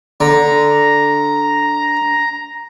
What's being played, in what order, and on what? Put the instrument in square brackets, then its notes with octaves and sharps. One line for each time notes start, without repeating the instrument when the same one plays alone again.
[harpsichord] D3 [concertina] A#5